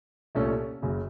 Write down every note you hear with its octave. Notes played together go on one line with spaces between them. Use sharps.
C2 A#2 A3 C#4 A4
F#1 F#2 C#3